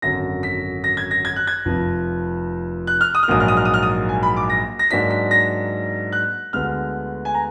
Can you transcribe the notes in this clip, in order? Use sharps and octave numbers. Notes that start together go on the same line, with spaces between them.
G#1 F#2 D3 A#6
B6
A#6
G#6
A#6
G#6
F#6
G#6
F1 F2 F3
F#6
F6
D#6
F6
A#1 G#2 F#3 A#3 D#6
F6
D#6
F6
D#6
F6
D#6
G#5
B5
D6
A#6
A#6
G#2 F#3 A#3 D4 B6
B6
A#6
F#6
D2 D3 G#3 B3 F6
G#5
A#5